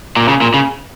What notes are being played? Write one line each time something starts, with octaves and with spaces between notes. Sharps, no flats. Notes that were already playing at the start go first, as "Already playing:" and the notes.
A#2
C#3
A#2
C#3